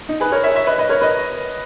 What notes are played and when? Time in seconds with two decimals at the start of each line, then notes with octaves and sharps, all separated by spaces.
0.09 D#4
0.20 G#4 B4
0.32 A#4 C#5
0.44 C#5 E5
0.55 C#5 E5
0.67 B4 D#5
0.78 B4 D#5
0.89 A#4 C#5
1.01 B4 D#5